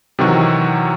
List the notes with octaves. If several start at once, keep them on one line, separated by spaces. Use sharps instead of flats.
C3 D#3 E3 F#3 C4 F#4